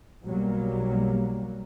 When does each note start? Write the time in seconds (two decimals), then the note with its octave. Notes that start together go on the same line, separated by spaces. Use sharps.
0.25 B1 F#3 G3 A#3